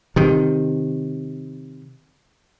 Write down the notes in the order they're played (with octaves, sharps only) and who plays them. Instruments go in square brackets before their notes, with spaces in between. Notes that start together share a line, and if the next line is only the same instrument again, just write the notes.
[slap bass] C3 D#3